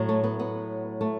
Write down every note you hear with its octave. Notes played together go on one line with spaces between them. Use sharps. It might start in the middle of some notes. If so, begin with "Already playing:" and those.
Already playing: A2 F#3
A3
B3
B3
A3